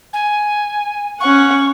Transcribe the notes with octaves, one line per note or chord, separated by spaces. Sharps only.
G#5
C#4 F#5 C#6